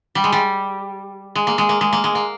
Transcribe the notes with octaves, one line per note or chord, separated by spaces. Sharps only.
G3
G#3
G3
G#3
A#3
G#3
A#3
G#3
A#3
G#3
A#3